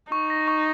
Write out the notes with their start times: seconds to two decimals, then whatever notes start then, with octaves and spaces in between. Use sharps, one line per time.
0.12 D#4 C#6
0.30 A#6
0.48 C#6